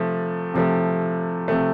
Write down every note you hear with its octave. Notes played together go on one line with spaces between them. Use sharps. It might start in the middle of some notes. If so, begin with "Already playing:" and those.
Already playing: C3 F3 A3
C3 F3 A3
C3 F3 A3